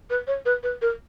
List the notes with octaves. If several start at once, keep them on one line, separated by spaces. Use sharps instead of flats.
B4
C#5
B4
B4
A#4